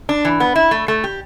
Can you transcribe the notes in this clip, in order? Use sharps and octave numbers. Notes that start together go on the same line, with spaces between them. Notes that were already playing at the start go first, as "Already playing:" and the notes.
D4
E3
B3
E4
A3
A3
G4